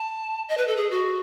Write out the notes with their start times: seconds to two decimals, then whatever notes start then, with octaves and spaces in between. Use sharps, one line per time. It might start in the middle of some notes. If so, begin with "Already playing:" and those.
Already playing: A5
0.49 D#5
0.57 B4
0.67 A4
0.77 G#4
0.91 F#4